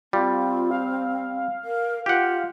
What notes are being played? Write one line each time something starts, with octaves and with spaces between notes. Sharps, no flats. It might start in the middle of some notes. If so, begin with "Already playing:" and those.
G3 C4 F4
F5
A#4
F4 G4 F#5